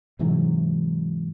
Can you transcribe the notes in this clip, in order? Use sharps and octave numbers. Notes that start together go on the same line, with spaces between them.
G#2 C3 E3 F#3